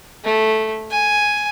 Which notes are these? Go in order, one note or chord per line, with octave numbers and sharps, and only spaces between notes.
A3
G#5